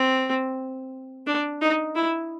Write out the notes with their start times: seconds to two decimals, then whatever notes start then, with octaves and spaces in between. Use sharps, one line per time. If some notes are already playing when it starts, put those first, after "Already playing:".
Already playing: C4
1.27 D4
1.61 D#4
1.95 E4